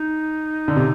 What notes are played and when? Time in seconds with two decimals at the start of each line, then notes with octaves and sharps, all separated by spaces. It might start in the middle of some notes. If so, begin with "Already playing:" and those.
Already playing: D#4
0.68 D3
0.76 C3